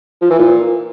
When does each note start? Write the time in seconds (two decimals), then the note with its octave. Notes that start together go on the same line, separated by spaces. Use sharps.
0.22 F3
0.30 E3
0.39 A#2